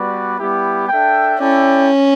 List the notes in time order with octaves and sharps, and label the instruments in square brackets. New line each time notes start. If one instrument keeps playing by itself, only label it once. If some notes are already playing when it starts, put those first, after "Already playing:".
Already playing: [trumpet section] G3 B3 F#4 B4 D5
G3 B3 E4 G4
D4 A4 E5 G5
[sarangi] C#4 [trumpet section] E4 A4 D5 G5